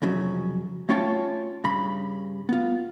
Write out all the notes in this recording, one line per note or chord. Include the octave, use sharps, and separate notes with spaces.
C2 F2 C#3 F#3
A3 C#4 F4 C#5 G5 A5
G2 C#3 B5
B3 F4